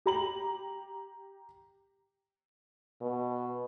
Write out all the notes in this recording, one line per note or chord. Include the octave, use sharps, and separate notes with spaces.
G4 A#5 F#7
B2